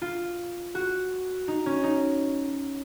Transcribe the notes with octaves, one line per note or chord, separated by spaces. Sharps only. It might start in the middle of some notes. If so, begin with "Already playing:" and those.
F4
F#4
D#4
C#4
D#4